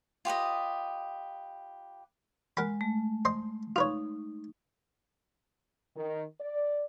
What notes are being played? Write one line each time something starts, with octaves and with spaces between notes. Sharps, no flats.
F4 G4 B4 D#5
G#3 A#4 F#5 B5
A3
C5 D#5 C6
D#4 F4 B4 C#5
D#3
D5